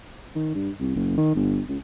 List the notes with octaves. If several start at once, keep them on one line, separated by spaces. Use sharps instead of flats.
D#3
G2
C2
F#1
D#3
G1
C#2